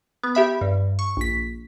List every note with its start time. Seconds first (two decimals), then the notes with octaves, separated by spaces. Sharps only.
0.23 B3
0.35 G4 E5 B5
0.61 G2
0.99 C#6
1.17 A#1 B6